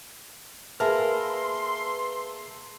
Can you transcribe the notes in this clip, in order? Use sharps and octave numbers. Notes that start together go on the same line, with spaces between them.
A#3 G#4 B4 E5 A5 C6 E6 F6